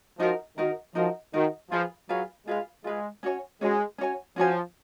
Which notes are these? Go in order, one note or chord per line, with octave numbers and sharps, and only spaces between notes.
F3 D#4 F#4 A#4
D#3 D#4 F#4 A#4
F3 D#4 F#4 A#4
D#3 D#4 F#4 A#4
F3 F4 G#4 B4 F5
F#3 F4 G#4 B4 F5
G#3 F4 G#4 B4 F5
G#3 F4 G#4 B4 F5
C#4 F#4 C#5 G#5
G#3 C#4 F#4 C#5 G#5
C#4 F#4 C#5 G#5
F3 C#4 F#4 C#5 G#5